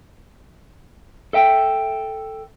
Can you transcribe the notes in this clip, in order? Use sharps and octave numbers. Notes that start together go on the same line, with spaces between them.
A4 E5 G5